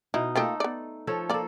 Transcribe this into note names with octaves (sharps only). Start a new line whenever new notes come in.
B2 D#4 E4
A3 A#3 D#4 F4 G4 A4
B3 D5
F3 A4 C#5
A#3 F4 A4 D5